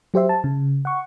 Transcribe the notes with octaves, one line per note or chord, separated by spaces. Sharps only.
F#3 G4 C5 E5 C6
A5
C#3
F#5 C#6